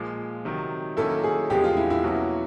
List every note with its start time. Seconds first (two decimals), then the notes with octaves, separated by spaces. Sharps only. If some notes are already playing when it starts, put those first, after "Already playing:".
Already playing: A#2 F3 G#3
0.45 C3 D#3 F#3
0.97 D#3 F#3 A#3 C#4 E4 A4
1.23 G#4
1.50 E2 C3 F3 G#3 G4
1.64 F4
1.77 E4
1.90 E4
2.04 B2 F#3 A#3 C#4 F#4